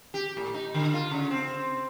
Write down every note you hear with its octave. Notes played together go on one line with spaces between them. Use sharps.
G4
A2
D#4
D3
F4
C#3
C4